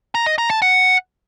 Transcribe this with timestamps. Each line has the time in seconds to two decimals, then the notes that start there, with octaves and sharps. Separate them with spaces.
0.15 A#5
0.27 D#5
0.38 A#5
0.50 A5
0.62 F#5